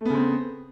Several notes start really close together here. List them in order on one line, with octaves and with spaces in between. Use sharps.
A3 B3 C#3 C4